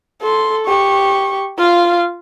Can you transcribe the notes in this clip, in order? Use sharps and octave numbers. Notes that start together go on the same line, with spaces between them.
A4 C6
G4 C#6
F4 F5